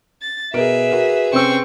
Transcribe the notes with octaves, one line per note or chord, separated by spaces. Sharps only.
A6
B2 G#4 A#4 B4 E5 D7
F#4 A#4
C3 C4 C#4 C#6 E6